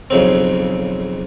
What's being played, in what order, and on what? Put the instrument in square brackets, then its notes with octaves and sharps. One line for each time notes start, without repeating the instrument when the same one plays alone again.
[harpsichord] B1 F2 C#3 C4